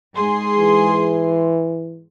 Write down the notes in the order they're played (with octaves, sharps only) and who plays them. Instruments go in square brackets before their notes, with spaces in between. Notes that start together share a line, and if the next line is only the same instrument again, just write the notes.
[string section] G#2 G#4 C6
[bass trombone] E3